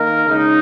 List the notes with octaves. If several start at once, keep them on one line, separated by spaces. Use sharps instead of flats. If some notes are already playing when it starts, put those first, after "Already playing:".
Already playing: D#3 A#3 D#4 A#4
C#3 G#3 D#4